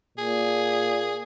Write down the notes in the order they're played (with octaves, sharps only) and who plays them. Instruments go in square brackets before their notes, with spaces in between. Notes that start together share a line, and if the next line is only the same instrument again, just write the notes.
[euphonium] A#2 [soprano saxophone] G#4